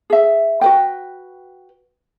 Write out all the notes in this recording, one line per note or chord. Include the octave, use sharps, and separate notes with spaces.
G#4 E5
F#4 B4 G5